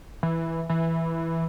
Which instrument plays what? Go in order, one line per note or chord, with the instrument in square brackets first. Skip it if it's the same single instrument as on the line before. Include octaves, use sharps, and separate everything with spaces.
[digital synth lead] E3
E3